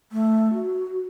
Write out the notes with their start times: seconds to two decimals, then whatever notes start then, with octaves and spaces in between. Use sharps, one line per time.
0.12 A3
0.53 F#4